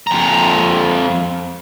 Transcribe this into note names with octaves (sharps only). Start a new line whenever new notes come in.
F2 A#5